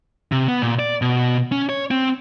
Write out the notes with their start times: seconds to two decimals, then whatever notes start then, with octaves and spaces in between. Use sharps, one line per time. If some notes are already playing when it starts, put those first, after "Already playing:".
0.32 C3
0.48 B3
0.62 A#2
0.79 D5
1.02 B2
1.52 C#4
1.69 C#5
1.91 C4